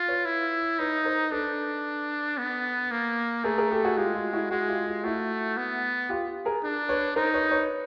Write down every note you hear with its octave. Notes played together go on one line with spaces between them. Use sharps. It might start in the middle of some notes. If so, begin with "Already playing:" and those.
Already playing: F4
B4 C#5
E4
D#4 B4 C#5
A#4 C5
D4 A4 B4
B3
A#3
A3 G#4 A#4
G#4 A#4
G4 A4
F#4 G#4
G#3 F4 G4
F4
E4 F#4
G#3 F#4 G#4
F4 G4
F4
A3 E4 F#4
B3
F4 G4
G#4 A#4
D4
B4 C#5
D#4 A#4 C5
B4 C#5
B4 C#5